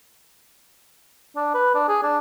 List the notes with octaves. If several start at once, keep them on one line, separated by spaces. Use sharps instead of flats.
D4
B4
D4
G#4
D4